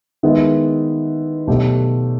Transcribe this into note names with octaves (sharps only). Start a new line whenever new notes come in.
D#3 G#3 B3 E4
B2 F#3 A3 D4 G4